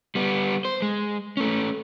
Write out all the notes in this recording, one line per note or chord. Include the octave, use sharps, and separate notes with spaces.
G3 B3
C5
G#3
A3 C#4